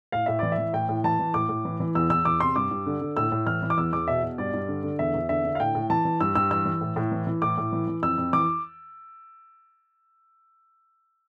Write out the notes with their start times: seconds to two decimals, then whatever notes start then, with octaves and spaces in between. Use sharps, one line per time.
0.12 A2 F5
0.26 A2 E5
0.39 E3 D5
0.52 E5
0.58 E3
0.73 A2 G5
0.89 A2
1.04 E3 A5
1.19 E3
1.34 A2 D6
1.49 A2
1.65 E3
1.80 E3
1.95 E2 E6
2.10 E3 E6
2.25 E2 D6
2.40 C3 C6
2.56 G2 D6
2.71 G2
2.86 D3
3.01 D3
3.17 A2 E6
3.32 A2
3.47 E3 F6
3.62 E3
3.70 D6
3.77 E2 E6
3.93 E2 D6
4.08 B2 E5
4.23 B2
4.38 G2 D5
4.53 G2
4.68 D3
4.83 D3
4.99 E2 E5
5.14 E2
5.29 D3 E5
5.45 D3
5.55 F5
5.60 A2 G5
5.75 A2
5.90 E3 A5
6.05 E3
6.20 G2 E6
6.35 G2 E6
6.51 E3 E6
6.65 E3
6.81 A2
6.96 A2
7.12 E3
7.27 E3
7.42 A2 D6
7.58 A2
7.72 E3
7.87 E3
8.02 F2 E6
8.18 F2
8.33 E3 D6